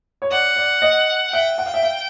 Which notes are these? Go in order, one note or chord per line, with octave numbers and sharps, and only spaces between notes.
C#5
D5 F#5
D5
D#5
E5 G5
F#5
F5
E5
F5